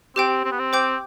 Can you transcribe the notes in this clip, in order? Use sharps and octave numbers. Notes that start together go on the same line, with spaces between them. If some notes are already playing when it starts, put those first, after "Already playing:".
C4 G4 C5 G5
C4
B3
C4
C5 G5 D6 G6